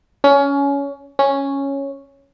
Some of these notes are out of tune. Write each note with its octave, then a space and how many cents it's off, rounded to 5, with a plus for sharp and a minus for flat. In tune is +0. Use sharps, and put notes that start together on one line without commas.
C#4 +20
C#4 -5